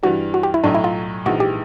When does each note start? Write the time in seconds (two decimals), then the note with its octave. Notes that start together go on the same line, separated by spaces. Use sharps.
0.03 G2 E3 G3 F#4
0.34 F#4
0.43 G4
0.54 E4
0.64 B1 A2 F#3 D4
0.74 E4
0.84 F4
1.26 A#1 G#2 E3 G#3 F#4
1.40 G4